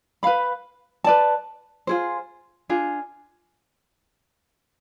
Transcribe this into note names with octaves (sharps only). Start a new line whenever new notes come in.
B4 F5 B5
B4 D5 A5
F4 G#4 C5
D4 F4 G#4